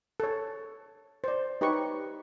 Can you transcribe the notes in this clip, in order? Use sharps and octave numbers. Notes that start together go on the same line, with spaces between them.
A4 C#5
C5 D5
D#4 G4 B4 C#5 C#6